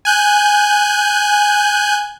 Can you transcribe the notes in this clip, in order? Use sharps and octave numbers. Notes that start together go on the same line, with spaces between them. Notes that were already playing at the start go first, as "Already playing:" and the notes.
G#5 F#6 G6